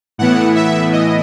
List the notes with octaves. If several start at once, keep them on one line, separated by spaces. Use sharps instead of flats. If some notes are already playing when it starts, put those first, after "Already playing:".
A2 E3 B3 E4 F#5
E5
D#5